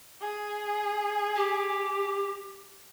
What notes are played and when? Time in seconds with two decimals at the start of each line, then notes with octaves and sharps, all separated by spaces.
0.21 G#4
1.36 G4